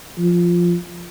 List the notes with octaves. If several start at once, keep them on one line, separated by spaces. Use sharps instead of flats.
F3